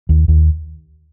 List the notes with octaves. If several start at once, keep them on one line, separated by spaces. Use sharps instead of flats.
D#2
D#2